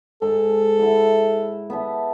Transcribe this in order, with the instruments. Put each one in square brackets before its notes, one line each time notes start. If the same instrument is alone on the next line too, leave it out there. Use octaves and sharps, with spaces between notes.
[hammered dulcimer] G#2 [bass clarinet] A4
[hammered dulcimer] E4 F#5
B3 E5 A5